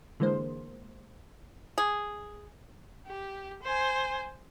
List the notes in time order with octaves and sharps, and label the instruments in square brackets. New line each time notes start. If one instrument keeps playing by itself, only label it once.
[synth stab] D3 E3 G#3 A#3 C5
[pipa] G#4
[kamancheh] G4
C5 G#5